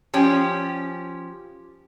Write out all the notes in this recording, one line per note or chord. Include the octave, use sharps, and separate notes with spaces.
F3 C#4 G4